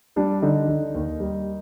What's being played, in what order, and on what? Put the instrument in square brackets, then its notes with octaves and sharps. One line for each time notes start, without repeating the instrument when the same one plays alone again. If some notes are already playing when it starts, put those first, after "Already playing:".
[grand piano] G3 D4
D3 D#4
D3
D#2
G3